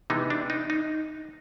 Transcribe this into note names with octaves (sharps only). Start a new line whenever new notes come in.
C3 E3 G#3 B3 D#4
D4
D#4
D#4